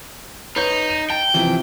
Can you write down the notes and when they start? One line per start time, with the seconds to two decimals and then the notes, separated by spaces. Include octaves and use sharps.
0.56 D#4 B4 C#5 G6
0.89 D#7
1.10 G5 A5
1.34 C3 E3 F3